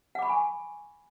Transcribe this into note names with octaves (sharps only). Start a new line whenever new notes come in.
F#5 G#5 B5 C#6 D6